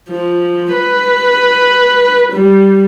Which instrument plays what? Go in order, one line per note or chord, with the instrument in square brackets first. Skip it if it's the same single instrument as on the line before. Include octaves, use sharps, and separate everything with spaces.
[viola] F3
B4
G3